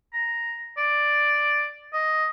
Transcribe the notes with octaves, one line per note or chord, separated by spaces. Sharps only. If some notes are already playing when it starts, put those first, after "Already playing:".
A#5
D5
D#5